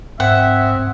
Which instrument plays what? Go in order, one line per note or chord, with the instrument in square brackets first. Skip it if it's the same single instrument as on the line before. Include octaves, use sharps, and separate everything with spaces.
[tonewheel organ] G#2 [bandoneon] C4 [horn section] E5 [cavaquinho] F#5